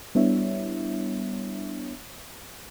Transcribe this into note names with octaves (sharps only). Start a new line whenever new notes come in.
G3 B3 D4 E4 C#5 E5